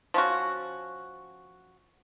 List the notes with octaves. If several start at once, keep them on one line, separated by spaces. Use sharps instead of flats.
F3 C#4 F#4